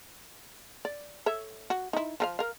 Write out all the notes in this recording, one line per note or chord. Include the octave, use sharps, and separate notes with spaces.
D5
A4 C#5 E5
F#4
D#4 E4
F3 A4 F5
A#4 F5